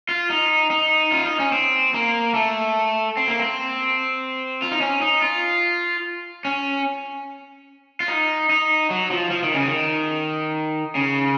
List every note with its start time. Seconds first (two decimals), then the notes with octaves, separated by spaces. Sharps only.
0.09 F4
0.30 D#4
0.71 D#4
1.12 F4
1.26 D#4
1.39 C#4
1.52 C4
1.94 A#3
2.34 A3
3.17 C4
3.28 A#3
3.39 C4
4.62 F4
4.72 D#4
4.81 C#4
5.02 D#4
5.21 F4
6.45 C#4
8.00 F4
8.08 D#4
8.50 D#4
8.90 F#3
9.11 F3
9.31 F3
9.43 D#3
9.54 C#3
9.66 D#3
10.95 C#3